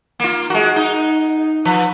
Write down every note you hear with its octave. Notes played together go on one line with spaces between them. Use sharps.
A#3 F4
G#3 F#4
D#4
F3 B4